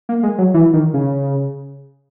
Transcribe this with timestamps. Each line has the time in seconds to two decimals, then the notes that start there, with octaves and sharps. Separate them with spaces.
0.09 A#3
0.23 G#3
0.38 F#3
0.54 E3
0.73 D#3
0.94 C#3